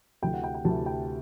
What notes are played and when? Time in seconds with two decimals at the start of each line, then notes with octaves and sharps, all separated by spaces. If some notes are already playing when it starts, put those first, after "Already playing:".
0.22 D2 C3 E3 G5
0.34 F#5
0.44 G5
0.55 G5
0.65 D2 C3 E3 A5
0.86 G5